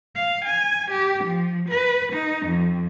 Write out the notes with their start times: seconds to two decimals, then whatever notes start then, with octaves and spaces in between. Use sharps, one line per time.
0.15 F5
0.45 G#5
0.91 G4
1.25 F3
1.69 B4
2.13 D#4
2.46 F2